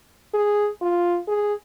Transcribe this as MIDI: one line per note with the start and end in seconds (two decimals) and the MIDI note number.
0.34 0.70 68
0.82 1.17 65
1.28 1.54 68